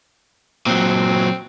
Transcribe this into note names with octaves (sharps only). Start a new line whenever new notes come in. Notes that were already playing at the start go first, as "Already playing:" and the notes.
A#2 F#3 C4